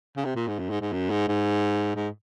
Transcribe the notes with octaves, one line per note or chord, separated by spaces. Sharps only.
C#3
C3
A#2
G#2
F#2
G#2
G#2
F#2
G#2
G#2
G#2